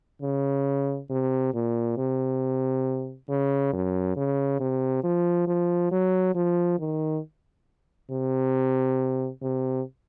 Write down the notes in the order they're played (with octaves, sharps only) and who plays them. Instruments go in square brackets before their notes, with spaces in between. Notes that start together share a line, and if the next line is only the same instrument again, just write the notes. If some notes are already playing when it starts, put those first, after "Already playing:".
[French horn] C#3
C3
A#2
C3
C#3
F#2
C#3
C3
F3
F3
F#3
F3
D#3
C3
C3